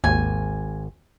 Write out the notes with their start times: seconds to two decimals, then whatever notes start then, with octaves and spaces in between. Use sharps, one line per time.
0.04 G#1 D#2 G#5